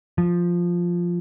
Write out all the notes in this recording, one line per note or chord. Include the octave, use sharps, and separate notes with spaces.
F3